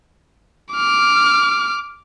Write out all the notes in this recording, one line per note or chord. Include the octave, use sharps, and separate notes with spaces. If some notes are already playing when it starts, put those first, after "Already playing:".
D6 F6